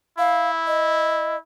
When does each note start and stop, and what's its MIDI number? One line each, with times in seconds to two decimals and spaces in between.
0.18 1.38 64
0.18 0.51 77
0.67 1.37 75